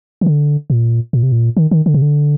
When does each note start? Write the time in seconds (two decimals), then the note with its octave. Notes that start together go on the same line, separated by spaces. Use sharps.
0.21 D#3
0.26 D3
0.70 A#2
1.13 A#2
1.23 C3
1.32 A#2
1.57 D#3
1.71 D#3
1.86 D3
1.94 C3
2.02 D3